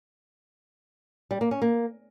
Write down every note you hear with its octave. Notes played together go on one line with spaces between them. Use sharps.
G3
A#3
C#4
A#3